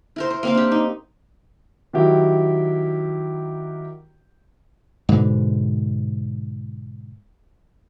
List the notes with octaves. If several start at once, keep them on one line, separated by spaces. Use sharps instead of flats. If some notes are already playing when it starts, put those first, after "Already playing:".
E4 A#4 C5
C5
A#3 C4 F5
D4 G4
D#4
D#3 F#3 E4 F#4 G4
G#2 B2 D3